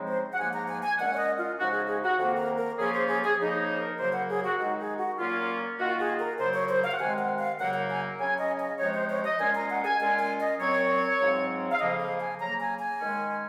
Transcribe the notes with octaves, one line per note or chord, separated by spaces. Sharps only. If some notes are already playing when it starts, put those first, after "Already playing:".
Already playing: C#3 F3 G#3 C4 D#4
C5
F#5
G#2 F3 A#3 G#5
A#5
G#5
G#5
A#2 G#3 C#4 F#5
C#5
D#5
F4
C#3 F3 G#3 D#4 F#4
G#4
G#4
F#4
F2 D#3 A#3 F#4
A#4
A#4
C#3 F3 A#3 C#4 F4 G#4
C5
G#4
G#4
C#3 F3 A#3 D#4
G#4
C5
A#4
F#2 C#3 F#3 A#3 C5
F#5
G#4
F#4
D#3 G#3 D#4 F#4
G#4
F#4
A#2 F#3 A#3 C#4 F4
D#3 A#3 F4 F#4
G#4
A#4
F#2 C#3 F#3 A#3 C5
C#5
C5
F5
F#5
C3 D#3 G#3 G#5
F#5
F5
F#2 C#3 F#3 A#3 D#4 F#5
F#5
G#5
C#3 F#3 C#4 G#5
D#5
D#5
C3 F3 G#3 D#4 C#5
C5
C#5
D#5
A#2 G#3 C#4 F4 G#5
A#5
F#5
G#5
A#2 G#3 C#4 F4 G#5
G#5
D#5
A#2 F#3 C4 C#5
G#2 F#3 C4 F4
F5
F2 C#3 F3 A#3 D#5
F5
G#5
C#3 F#3 A#3 A#5
G#5
G#5
D#3 G#3 C#4